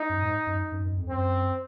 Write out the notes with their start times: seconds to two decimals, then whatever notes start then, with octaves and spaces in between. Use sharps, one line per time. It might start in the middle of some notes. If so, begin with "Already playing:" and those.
Already playing: D#4
0.09 F#2
0.22 G#2
0.47 F#2
0.72 F#2
0.84 F#2
0.97 F2
1.09 F#2 C4